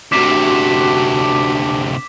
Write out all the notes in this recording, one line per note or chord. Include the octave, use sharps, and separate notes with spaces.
D2 C3 D4 F#4 D6 B6 E7